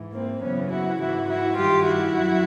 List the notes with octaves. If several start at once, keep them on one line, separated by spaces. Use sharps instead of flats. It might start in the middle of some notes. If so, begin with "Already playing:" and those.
Already playing: G#2 E3
A#3 C4
F#2 C#3 E3 B3 C#4
E4 F#4
G#2 E3 E4 F#4
E4 F#4
G2 D#3 F4 G4
E4 F#4
F#2